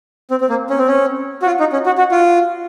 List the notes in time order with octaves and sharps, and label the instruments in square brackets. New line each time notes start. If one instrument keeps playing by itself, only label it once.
[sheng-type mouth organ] C4
C4
A#3
C#4
C4
C#4
F#4
F4
D#4
C#4
F#4
F#4
F4